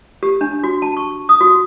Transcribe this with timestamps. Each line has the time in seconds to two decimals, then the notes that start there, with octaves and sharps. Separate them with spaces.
0.23 G4
0.41 D4
0.64 F#4
0.82 A5
0.97 C#6
1.29 D#6
1.41 F#4